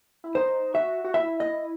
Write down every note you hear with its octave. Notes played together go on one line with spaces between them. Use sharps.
E4
D#4 C5
F#4 E5
F#4
E4 E5
D#5